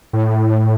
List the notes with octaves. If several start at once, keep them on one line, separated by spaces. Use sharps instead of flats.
A2